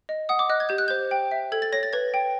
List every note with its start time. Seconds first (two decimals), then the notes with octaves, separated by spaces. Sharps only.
0.09 D#5
0.29 F#5 D#6
0.39 D6
0.49 D#5 F#6
0.60 G#6
0.69 G4 G6
0.78 F#6
0.88 C5 G6
1.11 G5
1.31 E5
1.52 A4 G#6
1.62 A6
1.73 C#5 A#6
1.83 A6
1.93 B4 G#6
2.14 G5